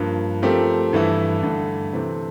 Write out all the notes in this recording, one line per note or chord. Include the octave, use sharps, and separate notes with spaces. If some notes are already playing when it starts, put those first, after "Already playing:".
Already playing: G2 F3 A#3
F3 A3 C4 G4 A#4
G2 E3 A3 E4
G2 D3 A3 D4
C3 E3 A3 C4